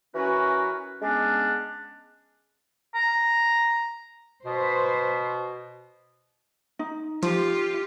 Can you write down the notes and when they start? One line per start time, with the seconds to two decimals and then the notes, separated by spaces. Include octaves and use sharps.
0.15 E3 C#4 F#4 A#4 B4 C#5
1.02 G#3 B3 C#4 D4
2.95 A#5
4.46 B2 B4 C5
6.79 D#4
7.23 F3 F4 G4